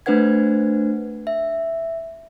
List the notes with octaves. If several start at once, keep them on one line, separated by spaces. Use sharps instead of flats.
A3 D4 B4 C5 F#5 G#6
E5